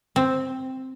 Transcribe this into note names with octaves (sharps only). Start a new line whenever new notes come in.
C4